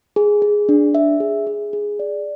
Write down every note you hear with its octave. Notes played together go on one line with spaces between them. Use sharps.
G#4
G#4
D4
E5
G#4
G#4
G#4
D5